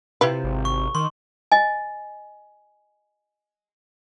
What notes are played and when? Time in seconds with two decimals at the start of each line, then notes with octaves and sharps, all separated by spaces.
0.21 C3 E4 F4 G4 B4
0.44 G#1
0.65 C#6
0.95 D#3 C6
1.52 D#5 G#5